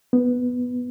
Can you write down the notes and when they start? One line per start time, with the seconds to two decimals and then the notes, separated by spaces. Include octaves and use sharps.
0.13 B3